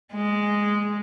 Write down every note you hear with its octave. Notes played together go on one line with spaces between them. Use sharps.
G#3